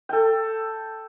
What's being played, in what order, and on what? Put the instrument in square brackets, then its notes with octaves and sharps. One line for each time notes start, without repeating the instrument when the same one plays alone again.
[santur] A4 G5